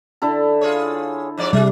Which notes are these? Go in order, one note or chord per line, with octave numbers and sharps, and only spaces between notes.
D3 E4 A4
F4 G#4 C#5
G#2 F3 D5
C3 G3 G#3